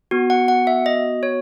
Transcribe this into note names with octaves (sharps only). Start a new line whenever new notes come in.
B3 F#4
F#5
F#5
E5
D#5
C#5